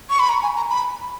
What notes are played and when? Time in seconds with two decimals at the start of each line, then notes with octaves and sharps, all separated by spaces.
0.10 C#6
0.19 B5
0.29 A#5
0.42 G#5
0.56 A#5
0.70 B5